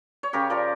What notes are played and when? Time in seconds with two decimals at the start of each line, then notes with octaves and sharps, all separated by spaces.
0.23 C#5
0.33 C#3 G4 A#4
0.50 F3 A#4 D5